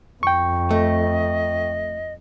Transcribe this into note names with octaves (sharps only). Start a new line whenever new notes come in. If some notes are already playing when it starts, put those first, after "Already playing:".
F2 G5 C#6
A3 D#5